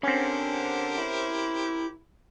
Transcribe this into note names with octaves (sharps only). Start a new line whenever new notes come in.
D3 C4 C#4 G4 A#4 C5
E4